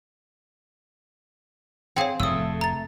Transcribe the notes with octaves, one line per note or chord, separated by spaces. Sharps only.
C4 G#4 C#5 F5 F#5
F1 F2 A2 A3 D#6 E6
A#5 A6